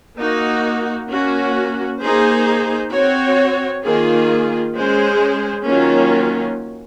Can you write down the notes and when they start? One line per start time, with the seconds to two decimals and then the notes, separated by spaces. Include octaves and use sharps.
0.18 A#3 D#4 F#4
1.08 A#3 C#4 F#4
2.01 A#3 D#4 G#4 C5
2.92 C4 F#4 C#5
3.84 D#3 A#3 F4 G#4
4.76 G#3 C#4 G#4 C5
5.67 D#3 F#3 A#3 C#4 F4